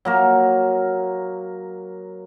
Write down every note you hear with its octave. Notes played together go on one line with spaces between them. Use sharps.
F#3 A#3 A#4